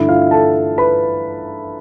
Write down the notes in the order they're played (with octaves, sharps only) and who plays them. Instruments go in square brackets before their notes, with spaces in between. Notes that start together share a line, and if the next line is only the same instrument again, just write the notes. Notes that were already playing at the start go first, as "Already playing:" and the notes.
Already playing: [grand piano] G2 D3 A3 E4 E5
F4 F5
A4 A5
B4 B5